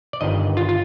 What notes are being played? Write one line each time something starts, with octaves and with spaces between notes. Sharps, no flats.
D5
G1 G2 D#3 D#5
F4
F4